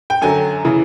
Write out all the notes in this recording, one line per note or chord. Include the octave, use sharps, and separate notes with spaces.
G5
F#2 D3 F#3 G#5
C#3 E3